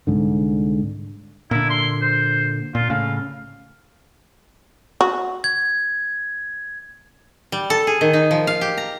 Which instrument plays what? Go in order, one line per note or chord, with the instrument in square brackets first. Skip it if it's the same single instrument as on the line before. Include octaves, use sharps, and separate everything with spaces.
[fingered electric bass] C2 G#2 D3
[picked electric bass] A#2 D3 [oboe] E4
[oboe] C6
C5
[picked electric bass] A#2 [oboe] F4
[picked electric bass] A2 C#3 [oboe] F5
[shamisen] F#4
[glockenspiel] G#6
[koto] G3
A4
G#4
D#3
D#4
F3
F5
G4
A#5